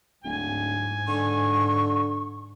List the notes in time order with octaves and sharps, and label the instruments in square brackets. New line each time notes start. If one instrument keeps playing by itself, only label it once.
[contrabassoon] D1 [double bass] G#2 [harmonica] G#5
[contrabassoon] D3 [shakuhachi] C#6